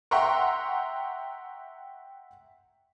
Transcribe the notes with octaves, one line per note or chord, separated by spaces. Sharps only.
E5 F#5 G5 A#5 C6 C#6